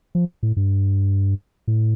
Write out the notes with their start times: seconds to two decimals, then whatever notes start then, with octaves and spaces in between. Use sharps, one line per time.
0.15 F3
0.43 A2
0.56 G2
1.68 A2